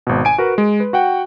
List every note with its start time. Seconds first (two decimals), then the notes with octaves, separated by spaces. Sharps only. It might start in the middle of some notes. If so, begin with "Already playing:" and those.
0.07 G#1 B2
0.25 G#5 D7
0.38 F#4 A#4 B4
0.58 G#3
0.80 B4
0.93 F#4 F#5 G5